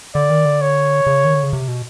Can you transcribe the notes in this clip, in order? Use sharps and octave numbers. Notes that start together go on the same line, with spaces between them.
D3 D5
D#3
D3
C#5
C#3
D#3
D3
C#3
C3
B2